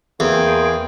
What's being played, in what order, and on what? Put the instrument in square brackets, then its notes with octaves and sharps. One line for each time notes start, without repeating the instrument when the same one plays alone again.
[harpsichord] E2 [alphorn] A#3 [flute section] G#4 G5 C6